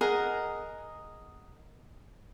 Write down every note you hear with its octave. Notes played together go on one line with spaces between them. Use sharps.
G#4 A#4 D#5 F#5